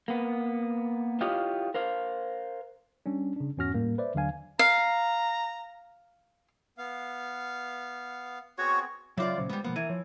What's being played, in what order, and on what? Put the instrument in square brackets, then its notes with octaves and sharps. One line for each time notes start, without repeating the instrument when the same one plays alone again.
[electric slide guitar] A#3 B3
E4 F4 G4 C#5 D#5 F5
A#4 C5 F5
[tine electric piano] G3 C#4 D4
C#3 D4
E2 G#2 C#4 F#4 F6 A#6
A2 G3 A#3
B4 C5 D5 E5
D#2 D3 F#3 D4 F5 G#5
[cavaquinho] F5 [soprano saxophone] A#5
[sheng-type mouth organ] B3 F5
[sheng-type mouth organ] B3 C4 G#4 [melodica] F#4 C#5
[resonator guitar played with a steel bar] C#3 F4 D5 [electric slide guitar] F#3 [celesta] C#5 E5 D6
[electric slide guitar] A#2 C#3 F#3 [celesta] C5
[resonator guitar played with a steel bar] G3 B3 [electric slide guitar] G#3
[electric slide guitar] B2 F3 A#3 [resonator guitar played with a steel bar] B3
[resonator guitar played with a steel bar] E3 [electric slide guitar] A#4 [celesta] E5 G#6 D#7
[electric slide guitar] F3 [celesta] C#5